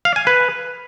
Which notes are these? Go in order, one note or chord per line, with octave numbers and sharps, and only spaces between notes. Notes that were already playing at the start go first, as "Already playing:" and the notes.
F5
G#5
B4